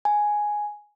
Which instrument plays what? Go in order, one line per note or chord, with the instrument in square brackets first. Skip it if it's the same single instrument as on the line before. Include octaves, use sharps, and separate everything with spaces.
[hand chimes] G#5